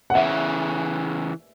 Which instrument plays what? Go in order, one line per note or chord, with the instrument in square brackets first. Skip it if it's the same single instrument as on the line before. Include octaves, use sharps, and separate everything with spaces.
[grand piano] F#5
[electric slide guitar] E2 C#3 E3 [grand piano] E5